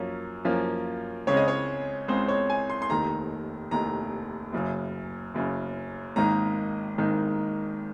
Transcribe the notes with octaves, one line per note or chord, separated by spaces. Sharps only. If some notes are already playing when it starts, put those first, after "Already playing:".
Already playing: F#2 F3 A#3 C#4
F#2 F3 A#3 C#4
C#2 C#3 G#3 C4 C#5
D#5
C#5
C#2 C#3 G#3 C4 C5
C#5
G#5
C6
C6
F1 D#2 D#3 A#5
F1 D#2 D#3 A#5
F#1 F#2 C#3
F#1 F#2 C#3
G#1 G#2 D#3 A#3 D#4 A#5
G#1 G#2 D#3 A#3 D#4